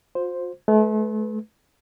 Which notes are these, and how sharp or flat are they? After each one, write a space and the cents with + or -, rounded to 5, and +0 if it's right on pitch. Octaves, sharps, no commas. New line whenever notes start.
F4 +45 C5 +0
A3 -40 B4 +0